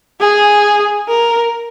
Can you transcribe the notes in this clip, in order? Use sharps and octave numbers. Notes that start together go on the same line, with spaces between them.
G#4
A#4